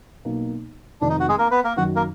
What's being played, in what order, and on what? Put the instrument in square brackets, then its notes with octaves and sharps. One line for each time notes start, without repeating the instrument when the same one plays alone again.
[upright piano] B1 B2 A#3
[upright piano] F1 F2 D#3 [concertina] D4
[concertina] D#4
F#4
G#3 G#4
A#3 A#4
B3 B4
A#3 A#4
[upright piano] F#2 D#3 F#3 [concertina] F#4
[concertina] A#3 A#4